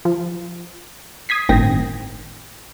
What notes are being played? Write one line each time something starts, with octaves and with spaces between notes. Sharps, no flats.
F3
D#6 G#6 B6 C7
G1 A2 D#3 C4 G5 A#6